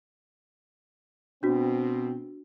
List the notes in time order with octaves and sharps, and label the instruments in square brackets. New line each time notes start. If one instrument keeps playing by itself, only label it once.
[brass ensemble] B2 C4 [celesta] D4 F#4